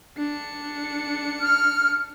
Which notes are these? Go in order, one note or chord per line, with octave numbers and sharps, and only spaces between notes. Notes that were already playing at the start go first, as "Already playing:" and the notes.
D4 C#7
F6